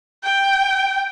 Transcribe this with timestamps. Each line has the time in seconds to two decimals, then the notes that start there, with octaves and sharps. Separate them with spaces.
0.23 G5